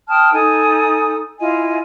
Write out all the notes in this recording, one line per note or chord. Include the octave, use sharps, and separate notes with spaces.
G5 A5 D#6 F6
D#4 A4 G#5 D#6
E4 F4 D#5 G#5